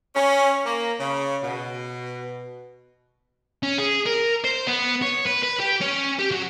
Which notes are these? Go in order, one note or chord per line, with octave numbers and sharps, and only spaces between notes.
C#4
A#3
C#3
B2
C#4
G#4
A#4
C5
B3
C#5
B4
B4
G4
C#4
G4
F#3